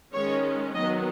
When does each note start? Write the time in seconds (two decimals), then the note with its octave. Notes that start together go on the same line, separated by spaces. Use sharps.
0.13 D#3 G#3 C#4 C#5
0.74 D#3 F#3 B3 D#5